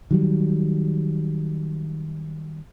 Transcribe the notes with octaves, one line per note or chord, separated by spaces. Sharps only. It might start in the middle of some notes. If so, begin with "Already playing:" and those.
D#3 F#3 G3